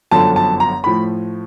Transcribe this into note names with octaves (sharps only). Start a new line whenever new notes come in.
G1 F#2 D3 F3 A5
A5
A#5
A2 F3 B5